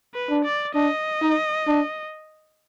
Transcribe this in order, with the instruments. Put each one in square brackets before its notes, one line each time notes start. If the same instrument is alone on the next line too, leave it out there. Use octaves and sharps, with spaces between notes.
[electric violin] B4
[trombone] D4
[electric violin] D5
[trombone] D4 [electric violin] D#5
[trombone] D#4
D4